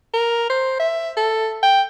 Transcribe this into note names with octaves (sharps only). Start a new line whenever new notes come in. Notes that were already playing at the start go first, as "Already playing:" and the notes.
A#4
C5
E5
A4
G5